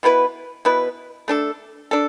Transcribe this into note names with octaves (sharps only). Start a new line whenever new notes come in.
B2 B3 E4 B4
B2 B3 E4 B4
A3 D4 A4
D4 A4